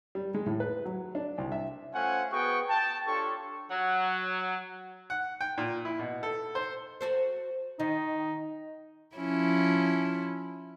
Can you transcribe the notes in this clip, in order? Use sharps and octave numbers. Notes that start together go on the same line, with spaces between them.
G3
G#3
A2
B4
F#3
D4
C2
E5
A3 C#4 F4 C5 F#5 G#5
B3 F#4 G#4 F#5 G5 C#6
G5 A5
D4 F4 G4 A4 C#5 C#6
F#3
F#5
G5
A#2
E4
B2
A4
C5
F#4 A4 C5
D#3 D#4
F3 C#4 E4